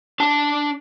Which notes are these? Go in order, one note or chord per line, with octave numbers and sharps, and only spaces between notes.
D4 A5